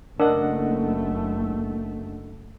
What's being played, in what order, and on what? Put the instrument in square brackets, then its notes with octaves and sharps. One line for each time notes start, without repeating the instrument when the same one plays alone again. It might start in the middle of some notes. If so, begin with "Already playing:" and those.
[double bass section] F#1 A3 [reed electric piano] D4 D#5 F#5 [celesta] A#4